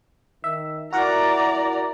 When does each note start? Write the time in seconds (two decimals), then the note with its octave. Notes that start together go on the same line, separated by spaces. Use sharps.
0.44 D#3 E5
0.93 E4 F#4 A#4 D5 F#5 A#5